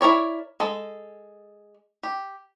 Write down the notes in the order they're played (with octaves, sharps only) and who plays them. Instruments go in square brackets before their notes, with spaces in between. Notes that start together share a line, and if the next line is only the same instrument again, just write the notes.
[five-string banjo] E4 A#4 C#5 D5
G#3 A4
G4